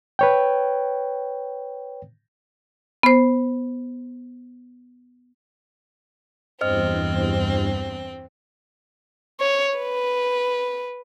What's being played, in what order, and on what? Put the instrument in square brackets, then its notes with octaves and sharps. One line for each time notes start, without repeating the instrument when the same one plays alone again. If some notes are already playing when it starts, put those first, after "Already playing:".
[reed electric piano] B4 C#5 G5
[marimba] B3 C5
[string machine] E2 G2 [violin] C4 [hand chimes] C5 D#5 F6
[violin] C#5
B4